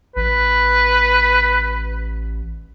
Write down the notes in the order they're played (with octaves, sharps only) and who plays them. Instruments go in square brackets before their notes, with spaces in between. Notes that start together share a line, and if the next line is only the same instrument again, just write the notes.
[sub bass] A1 [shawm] B4